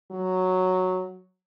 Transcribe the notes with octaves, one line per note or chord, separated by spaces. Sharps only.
F#3